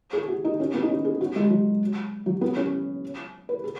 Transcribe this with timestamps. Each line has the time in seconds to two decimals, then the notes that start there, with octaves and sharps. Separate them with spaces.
0.13 G#4
0.28 F#4
0.45 D#4
0.60 C#4
0.74 B3
0.83 D#4
0.89 C#4
1.05 G#4
1.21 F#4
1.36 G#3
1.50 F#3
2.26 F#3
2.41 B3
2.57 C#4
3.49 B4
3.64 G#4